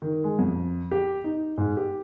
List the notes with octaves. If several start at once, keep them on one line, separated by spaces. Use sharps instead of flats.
D#3
G#3
F2
G4
D#4
G#2
G4